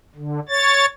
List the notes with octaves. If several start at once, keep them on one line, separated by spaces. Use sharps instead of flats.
D3
C#5 A6